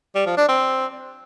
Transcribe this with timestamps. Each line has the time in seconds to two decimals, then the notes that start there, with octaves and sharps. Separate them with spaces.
0.15 G3
0.26 F3
0.37 D4
0.48 C4